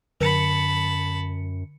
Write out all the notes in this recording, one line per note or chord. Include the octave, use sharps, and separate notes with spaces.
F#2 D3 A5 B5 C#7